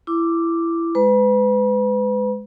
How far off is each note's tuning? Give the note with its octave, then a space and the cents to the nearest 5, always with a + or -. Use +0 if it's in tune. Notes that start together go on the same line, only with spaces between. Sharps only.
E4 +20 D6 +0
G#3 +0 B4 +30 B5 -45